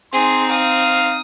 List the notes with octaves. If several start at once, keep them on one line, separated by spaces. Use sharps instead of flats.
C4 D#4 G#4 C6
F5 D#6